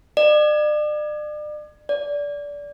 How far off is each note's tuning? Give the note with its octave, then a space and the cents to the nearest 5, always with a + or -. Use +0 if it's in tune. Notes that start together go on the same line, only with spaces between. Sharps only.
D5 +40
D5 -20